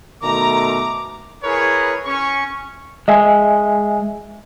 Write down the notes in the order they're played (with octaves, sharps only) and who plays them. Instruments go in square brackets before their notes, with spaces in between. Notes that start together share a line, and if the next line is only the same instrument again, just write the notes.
[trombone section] B2 D#3 A3 [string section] A#5 [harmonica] D6
[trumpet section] E4 G#4 A#4 B4 C#5
C#4 C#6
[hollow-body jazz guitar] G#3 [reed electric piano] D#5 E5 G#5